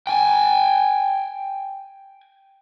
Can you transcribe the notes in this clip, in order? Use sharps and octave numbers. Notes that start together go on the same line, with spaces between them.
G5 G#5